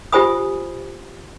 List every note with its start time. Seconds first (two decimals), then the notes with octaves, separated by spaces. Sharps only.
0.12 F4 G4 C5 G#5 B5 D#6